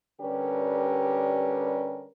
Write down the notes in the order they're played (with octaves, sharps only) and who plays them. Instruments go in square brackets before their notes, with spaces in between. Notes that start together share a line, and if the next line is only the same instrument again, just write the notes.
[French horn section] D3 G3 C#4 G4 A#4 B4